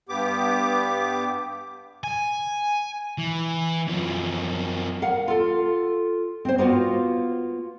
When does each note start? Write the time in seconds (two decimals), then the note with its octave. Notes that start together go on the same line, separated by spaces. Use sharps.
0.09 G2 B3 G4 D6
2.04 G#5
3.18 E3
3.88 F#2 F3
5.02 A#4 F5 F#5
5.28 F4 A4
6.45 C4 C5
6.58 A#3 B3 F4 F#4